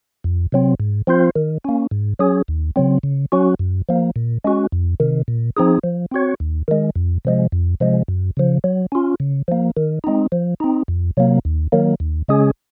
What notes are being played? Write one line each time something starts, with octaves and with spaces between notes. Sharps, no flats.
F2
C3 F#3 C4
G#2
F3 C4 F4 C5
D#3
A#3 C#4
G#2
F#3 C#4 G#4
D#2
C#3 F#3 C4
C#3
F#3 C#4 F#4
F#2
F3 A#3
A#2
G#3 C#4 F#4
F2
C3 D#3
A#2
F3 C4 D#4 G#4
F3
C4 F#4 C#5
D#2
D#3 G#3
F2
C3 F3 G#3
F2
C3 F3 G#3
F#2
C#3 F3
F#3
C#4 F4
C#3
F3 A#3
D#3
G#3 C4 D#4
F3
C4 D#4
F2
C3 F#3 A#3
D#2
D#3 F#3 A#3
D#2
C#3 G#3 C#4 G#4